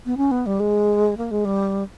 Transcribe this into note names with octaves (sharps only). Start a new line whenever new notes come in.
B3
C#4
B3
G3
G#3
A#3
G#3
G3